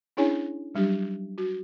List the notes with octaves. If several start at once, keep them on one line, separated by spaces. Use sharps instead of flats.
C#4 D4 E4 G#4 C#5 G#5
F#3 G3 D4 G4
F#4